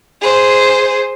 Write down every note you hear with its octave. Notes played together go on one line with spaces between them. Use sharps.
G#4 C5